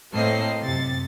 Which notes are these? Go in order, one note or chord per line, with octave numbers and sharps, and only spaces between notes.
A2 A#3 C4 A4 D#5 C7
F#2 C3 A6